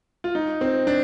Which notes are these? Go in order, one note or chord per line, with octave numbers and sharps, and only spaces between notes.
F4
D#4
C4
D4